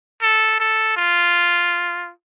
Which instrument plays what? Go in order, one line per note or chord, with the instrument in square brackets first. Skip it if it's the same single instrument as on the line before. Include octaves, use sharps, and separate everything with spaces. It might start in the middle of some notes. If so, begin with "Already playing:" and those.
[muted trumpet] A4
A4
F4